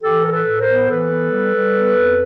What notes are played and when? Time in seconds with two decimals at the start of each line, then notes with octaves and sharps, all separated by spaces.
0.03 E3 G4 A4
0.24 A2 A#4
0.31 A4 B4
0.45 A2
0.60 A#4 C5
0.68 B3
0.89 E3 A4 B4
1.10 B3
1.31 G3
1.54 G3
1.74 B3
1.96 F2